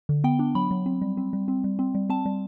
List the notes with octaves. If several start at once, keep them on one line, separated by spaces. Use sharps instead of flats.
D3
B3 G5
D4
F#3 B5
F#3
C4
G3
C4
G3
C4
G3
C4
G3
C4 A5
G3